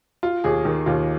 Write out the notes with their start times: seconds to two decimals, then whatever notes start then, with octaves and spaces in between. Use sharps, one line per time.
0.23 F4
0.44 D#2 G#4
0.65 D#3
0.86 D#2 F4